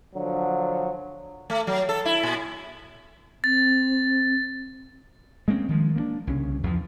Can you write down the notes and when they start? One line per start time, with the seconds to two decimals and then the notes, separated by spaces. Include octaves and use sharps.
0.15 D3 F3 F#3
1.50 A3
1.67 F#3
1.89 A4
2.05 E4
2.23 A#2
3.44 C4 A6
5.48 G#3 A#3 C4 C#4
5.69 D#3 F3 G#3
5.96 A#3 B3 D4
6.27 C2 C#3 C#4
6.63 E2 F3